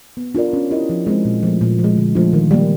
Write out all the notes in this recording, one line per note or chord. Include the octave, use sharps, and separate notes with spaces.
B3
D4 F4 A#4 D5
C#4
E4 G4 A#4 D#5
F3
G#3 C4
A#2
F3 A3
A#2
F3
G#3
D3
F3 A3 D4 F4
D#3
G3 A#3